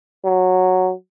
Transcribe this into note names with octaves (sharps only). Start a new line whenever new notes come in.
F#3